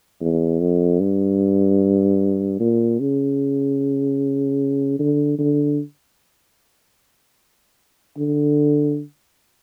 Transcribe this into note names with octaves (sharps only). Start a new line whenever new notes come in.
E2
F2
G2
A#2
C#3
D3
D3
D3